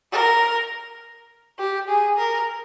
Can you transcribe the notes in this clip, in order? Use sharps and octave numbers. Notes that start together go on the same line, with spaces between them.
A#4
G4
G#4
A#4